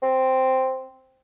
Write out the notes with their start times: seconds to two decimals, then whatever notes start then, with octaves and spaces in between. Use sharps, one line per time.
0.02 C4